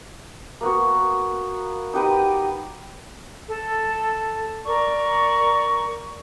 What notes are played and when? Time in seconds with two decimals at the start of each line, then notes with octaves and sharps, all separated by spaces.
0.61 A#3 B3 F#4
1.93 D#4 G4 B4 D#5
3.47 A4
4.65 A#4 D5 C#6